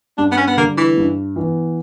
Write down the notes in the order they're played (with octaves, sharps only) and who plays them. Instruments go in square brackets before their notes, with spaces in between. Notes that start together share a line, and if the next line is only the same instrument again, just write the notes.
[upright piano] G2 [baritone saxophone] D4
[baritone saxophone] B3
C#4
B3
[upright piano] D3 G3 [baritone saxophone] A#3
[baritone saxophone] E3
[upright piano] G2
E3 B3